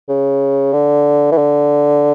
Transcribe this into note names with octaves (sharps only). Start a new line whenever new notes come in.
C#3
D3
E3
D3